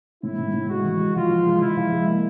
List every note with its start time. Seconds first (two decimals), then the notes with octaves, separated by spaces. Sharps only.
0.23 A2 E4
0.38 A2
0.54 A2
0.69 G#3 F#4
0.84 E3
0.99 G#3
1.15 F3 F4
1.30 F3
1.46 G#3
1.61 F3 E4
1.77 F3
1.92 G#3
2.07 A#3